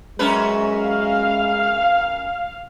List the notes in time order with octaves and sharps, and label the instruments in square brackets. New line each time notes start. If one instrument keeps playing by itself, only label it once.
[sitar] F#2 C#4 B4 [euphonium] G#3
[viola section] F5